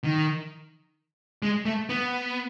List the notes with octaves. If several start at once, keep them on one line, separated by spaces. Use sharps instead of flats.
D#3
G#3
A3
B3